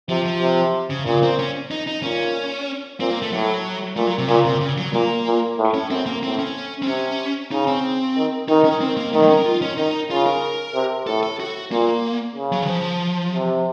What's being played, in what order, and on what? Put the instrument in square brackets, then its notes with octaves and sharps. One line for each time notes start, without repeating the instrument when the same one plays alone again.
[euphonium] C3 [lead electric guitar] F3
[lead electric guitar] F3
[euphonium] C3
[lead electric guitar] C#3
[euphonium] A#2 [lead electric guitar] C#3
[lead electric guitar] C4
C#4
D#4
D#4
[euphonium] A#2 [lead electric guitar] C#4
[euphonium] A#2 [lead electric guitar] C4
[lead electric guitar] A#3
A3
[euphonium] A2 [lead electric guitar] F#3
[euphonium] A#2 [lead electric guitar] A3
[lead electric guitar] F#3
C3
[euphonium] A#2 [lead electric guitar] C#3
[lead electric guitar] C3
C#3
F#3
[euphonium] A#2 [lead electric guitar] A#3
[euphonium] A#2
A2
[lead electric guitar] C#4
[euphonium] F#2 [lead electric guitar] C4
[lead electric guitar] A#3
[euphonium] A2 [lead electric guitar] C4
[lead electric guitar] C#4
C4
[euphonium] C3 [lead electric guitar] C#4
[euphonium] C#3 [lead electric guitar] D#4
[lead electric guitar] C4
[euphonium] D#3
[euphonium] D#3 [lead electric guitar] D#4
[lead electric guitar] C#4
C4
A#3
[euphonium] D#3 [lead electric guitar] A3
[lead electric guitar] F#3
C#4
A#4
F4
C#4
[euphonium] D#3 [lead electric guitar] D#4
[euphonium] C#3 [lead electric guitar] F4
[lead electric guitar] A#4
[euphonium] C3
[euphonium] A2 [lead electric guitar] A4
[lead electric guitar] A4
F#4
[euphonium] A#2 [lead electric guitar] A#3
[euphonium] C#3
[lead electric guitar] F#3
D#3
F3
[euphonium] C3